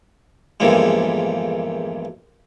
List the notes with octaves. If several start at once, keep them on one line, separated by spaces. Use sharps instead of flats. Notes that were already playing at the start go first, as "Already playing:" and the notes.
E2 G2 A#2 D3 F3 G#3